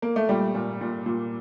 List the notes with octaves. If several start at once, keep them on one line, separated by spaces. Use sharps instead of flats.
A#3
A3
A#2 G3
A#2
A#2
A#2